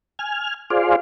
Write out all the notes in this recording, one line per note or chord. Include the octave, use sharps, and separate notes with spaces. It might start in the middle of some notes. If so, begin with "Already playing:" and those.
G#5 F6
F4 G#4 C5 D5 F5